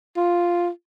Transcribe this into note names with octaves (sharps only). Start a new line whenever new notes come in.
F4